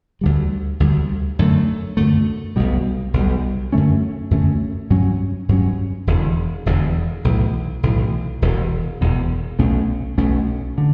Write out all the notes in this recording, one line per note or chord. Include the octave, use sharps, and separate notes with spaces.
D2 D3 G3
D2 D3 G3
F#2 D3 A3
F#2 D3 A3
B1 B2 G3
B1 B2 G3
F#2 D3 A3 C#4
F#2 D3 A3 C#4
G2 F#3 C#4
G2 F#3 C#4
E1 E2 D3
E1 E2 D3
B1 A2 E3
B1 A2 E3
E1 E2 B2
E1 E2 B2
B1 B2 A3 C#4
B1 B2 A3 C#4
D3